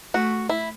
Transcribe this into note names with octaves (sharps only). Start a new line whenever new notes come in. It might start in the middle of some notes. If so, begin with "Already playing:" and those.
A3 F#4
E4